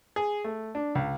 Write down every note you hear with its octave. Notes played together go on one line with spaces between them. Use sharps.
G#4
A3
D4
C#2